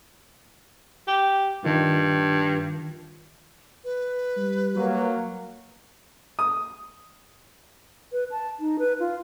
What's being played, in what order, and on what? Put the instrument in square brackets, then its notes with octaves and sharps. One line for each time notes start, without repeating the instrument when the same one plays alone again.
[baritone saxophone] G4
[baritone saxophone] G2 [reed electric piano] D#3 F4
[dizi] B4
[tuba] G3
[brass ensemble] F#3 A#3
[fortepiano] D#6
[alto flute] B4
A5
D#4
B4
F4